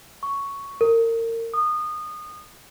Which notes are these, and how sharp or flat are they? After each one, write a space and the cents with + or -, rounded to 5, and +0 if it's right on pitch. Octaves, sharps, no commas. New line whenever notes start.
C#6 +5
A#4 -30
D#6 -25